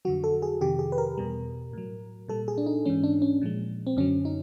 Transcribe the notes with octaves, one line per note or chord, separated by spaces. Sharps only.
F2 D3 F#3 F#4
A4
G#4
F2 C3 D#3 G4
G#4
B4
A#4
E2 B2 G3
A2 F#3
A#2 G3 A4
G#4
D4
D#4
G#2 E3 G#3 C#4
D4
C#4
A#2 F3 G#3
C4
F#2 D3 F#3 C#4
D#4